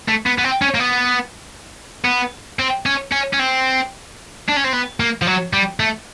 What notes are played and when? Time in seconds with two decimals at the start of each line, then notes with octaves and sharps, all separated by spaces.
0.09 A3
0.26 B3
0.38 B3
0.44 C4
0.62 C#4
0.75 A#3
0.80 B3
2.05 B3
2.59 C4
2.86 C#4
3.12 C#4
3.33 C#4
3.39 C4
4.49 D4
4.57 C#4
4.64 C4
4.73 B3
5.00 A#3
5.22 F3
5.27 F#3
5.53 G3
5.80 A3